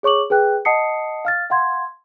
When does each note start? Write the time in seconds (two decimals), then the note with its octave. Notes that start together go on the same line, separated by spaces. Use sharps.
0.03 G#4 C#5 C#6 D6 F#7
0.30 G#4 B4 G5 F#6
0.65 D#5 F#5 A5 D#6 C7 C#7
1.25 F5 F6 A6
1.50 F5 F#5 C6 G#6